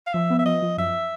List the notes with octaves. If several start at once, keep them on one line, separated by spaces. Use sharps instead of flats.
F5
F3 E5
B3
E5
F3 D#5
F3
F#2 E5